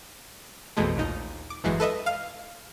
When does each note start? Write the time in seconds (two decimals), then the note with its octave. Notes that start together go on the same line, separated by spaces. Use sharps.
0.77 A#1 F2 B2 E3 G#3 A3
0.96 A#1 D#2 A#2 D#4
1.50 D6
1.64 G1 E2 E3 F#3 G#3 C7
1.80 A4 B4 D#5 E5
2.06 F5 F6